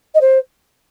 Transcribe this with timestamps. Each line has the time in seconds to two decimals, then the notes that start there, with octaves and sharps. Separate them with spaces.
0.15 D#5
0.21 C5